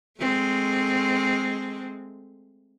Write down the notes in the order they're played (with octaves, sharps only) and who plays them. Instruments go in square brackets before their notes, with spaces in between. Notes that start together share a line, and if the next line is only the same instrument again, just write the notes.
[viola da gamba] G#3 A3 C4